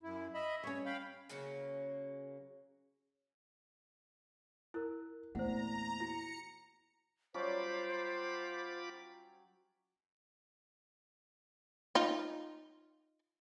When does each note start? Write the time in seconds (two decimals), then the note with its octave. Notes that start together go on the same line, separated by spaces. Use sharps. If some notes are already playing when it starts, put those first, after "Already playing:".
0.03 F#2 E4
0.34 D#5 E5 B5
0.63 G3 C#4 C#5
0.86 F5 G5 B5
1.29 C#3 F#3 A#3 C#4
4.74 E4 A#4 F#6
5.35 A#1 E2 E3 A3 C5 F#5 A#5
6.00 E4 F#4 C#7
7.34 F#3 G3 C#4 F4 C5 B5 D6
11.95 D#4 F4